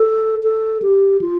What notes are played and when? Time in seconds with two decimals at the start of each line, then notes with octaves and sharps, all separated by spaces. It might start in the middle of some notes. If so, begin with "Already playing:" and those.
Already playing: A4
0.43 A4
0.82 G4
1.21 F4